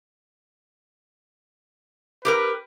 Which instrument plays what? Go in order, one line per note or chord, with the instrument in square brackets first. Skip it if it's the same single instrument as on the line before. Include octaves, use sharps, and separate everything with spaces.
[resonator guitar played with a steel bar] G4 G#4 A#4 [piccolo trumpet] B4